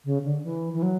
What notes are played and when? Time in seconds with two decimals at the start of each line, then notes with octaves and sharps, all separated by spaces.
0.05 C#3
0.24 D3
0.43 E3
0.73 E3
0.82 F#3